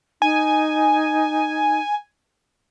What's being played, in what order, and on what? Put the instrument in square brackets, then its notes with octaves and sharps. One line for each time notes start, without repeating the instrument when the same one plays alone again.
[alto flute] D#4 [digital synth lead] G#5